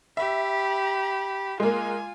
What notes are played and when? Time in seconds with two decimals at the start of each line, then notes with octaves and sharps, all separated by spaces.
0.17 G4 E5 B5
1.60 G#3 A#3 F4 G#5